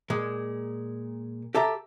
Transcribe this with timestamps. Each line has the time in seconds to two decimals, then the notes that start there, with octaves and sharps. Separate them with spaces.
0.10 A#2 G#3
1.55 G4 A4 E5 A#5